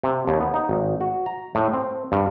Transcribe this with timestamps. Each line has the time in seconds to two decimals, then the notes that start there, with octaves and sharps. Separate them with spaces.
0.03 C3
0.27 D#2
0.41 B3
0.54 D#4
0.69 G#1
1.01 F#4
1.26 A#5
1.55 A2
1.73 C4
2.12 G2